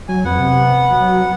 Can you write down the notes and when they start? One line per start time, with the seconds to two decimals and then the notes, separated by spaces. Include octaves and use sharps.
0.09 F#3 G#5
0.25 F2 B3 F#5
0.39 C3
0.91 F#3